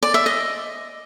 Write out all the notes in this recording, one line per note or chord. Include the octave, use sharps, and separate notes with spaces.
D5
E5
D#5